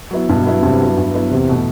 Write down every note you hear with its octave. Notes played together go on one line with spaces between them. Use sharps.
F#3 B3 E4
G2 B2
F#3 B3 E4
G2 C3
F#3 B3 E4
G2
F#3 B3 E4
E2 C3
B2 A3